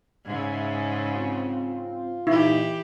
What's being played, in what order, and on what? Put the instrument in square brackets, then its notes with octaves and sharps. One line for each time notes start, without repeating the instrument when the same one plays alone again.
[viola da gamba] G#2 C#3 [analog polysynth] E5 G#6
[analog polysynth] C4 [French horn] F4
[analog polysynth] A#2 D#4 [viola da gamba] E3 G4 [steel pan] E4